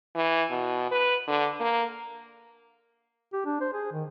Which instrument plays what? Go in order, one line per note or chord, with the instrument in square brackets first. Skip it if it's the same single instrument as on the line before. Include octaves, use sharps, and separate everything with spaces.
[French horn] E3
B2
B4
D3
A#3
[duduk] G4
D4
C5
G#4
D#3